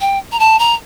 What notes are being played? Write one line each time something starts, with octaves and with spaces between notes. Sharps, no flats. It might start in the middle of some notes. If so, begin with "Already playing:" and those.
G5
A#5
A5
A#5